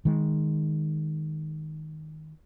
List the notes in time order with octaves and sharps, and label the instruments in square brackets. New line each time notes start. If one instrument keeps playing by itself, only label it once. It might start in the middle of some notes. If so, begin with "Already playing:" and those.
[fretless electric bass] D#3 G#3